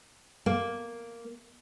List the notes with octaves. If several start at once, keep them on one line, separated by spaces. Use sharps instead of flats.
A#3